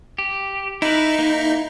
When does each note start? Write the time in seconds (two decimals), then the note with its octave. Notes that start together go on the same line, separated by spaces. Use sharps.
0.18 G4
0.82 D#4 E4 B4
1.19 A#3 E4